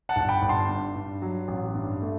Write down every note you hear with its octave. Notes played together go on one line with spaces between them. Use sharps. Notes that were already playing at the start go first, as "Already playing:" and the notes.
F#5 A5
G1
G5 B5
G1
A5 C6
G2
G2
F#3
A1
G2
A3